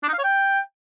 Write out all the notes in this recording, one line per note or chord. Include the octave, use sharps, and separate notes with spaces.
D4
D#4
F5
C#5
G5